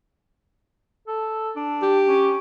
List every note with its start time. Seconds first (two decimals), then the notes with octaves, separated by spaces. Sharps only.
1.07 A4
1.56 D4
1.82 G4
2.08 C#4